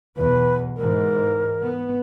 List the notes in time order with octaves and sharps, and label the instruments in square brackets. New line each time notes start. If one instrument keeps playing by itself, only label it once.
[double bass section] B1 E2 [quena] B4
[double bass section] G#2 E3 [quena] A#4
[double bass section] B3